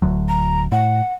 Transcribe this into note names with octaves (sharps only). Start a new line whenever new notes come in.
D1 D2 F#3
A#5
A2 F#5